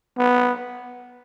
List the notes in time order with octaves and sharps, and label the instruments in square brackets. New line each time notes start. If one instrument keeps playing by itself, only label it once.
[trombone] B3